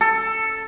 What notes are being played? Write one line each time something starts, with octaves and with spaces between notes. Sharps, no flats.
A4